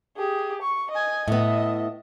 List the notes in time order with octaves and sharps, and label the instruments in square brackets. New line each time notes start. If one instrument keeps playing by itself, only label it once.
[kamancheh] G4 G#4
C#6
D#5 G#5
[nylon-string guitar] A2 B3 [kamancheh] D#5 E5